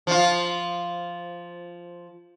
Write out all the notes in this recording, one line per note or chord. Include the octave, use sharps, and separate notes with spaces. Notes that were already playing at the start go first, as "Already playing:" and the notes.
F3 F4